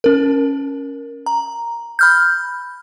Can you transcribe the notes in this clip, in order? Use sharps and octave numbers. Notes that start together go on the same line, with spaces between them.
C#4 A#4
A#5
B5 F6 G6